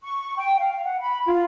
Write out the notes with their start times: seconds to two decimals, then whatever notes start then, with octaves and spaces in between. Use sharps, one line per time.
0.01 C#6
0.36 G5
0.59 F5
0.85 F#5
0.99 B5
1.25 F4